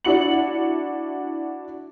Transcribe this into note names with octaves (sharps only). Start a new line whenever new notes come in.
D4 E4 F#4 C#7 F#7